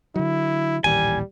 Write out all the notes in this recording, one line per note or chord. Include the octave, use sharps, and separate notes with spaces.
D3 F#3 E4
D#1 A1 D#2 G3 G#5